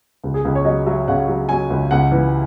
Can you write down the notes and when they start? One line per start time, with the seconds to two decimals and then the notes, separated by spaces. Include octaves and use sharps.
0.24 C#2
0.34 G#4
0.44 C#2 G#4
0.55 C#5
0.65 F#3 D#5
0.86 F#3 E5
1.08 C#3 F#5
1.29 F#3
1.49 F#3 G#5
1.70 C#2
1.91 C#2 F#5
2.12 E3